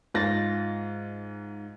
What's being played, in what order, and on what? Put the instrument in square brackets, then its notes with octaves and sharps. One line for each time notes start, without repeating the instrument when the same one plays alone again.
[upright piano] G#2 F4 A6 A#6